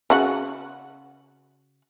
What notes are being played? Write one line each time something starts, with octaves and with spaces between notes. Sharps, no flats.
C#3 F#4 F#5